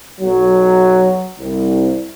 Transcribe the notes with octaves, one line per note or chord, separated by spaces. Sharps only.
B1 F#3
C2